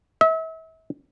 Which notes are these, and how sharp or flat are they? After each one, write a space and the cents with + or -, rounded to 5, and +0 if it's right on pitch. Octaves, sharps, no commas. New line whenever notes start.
E5 -35